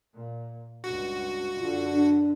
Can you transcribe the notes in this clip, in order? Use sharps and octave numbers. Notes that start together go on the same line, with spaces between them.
A#2
C#2 G2 F#4
F#2 D3 F4
D4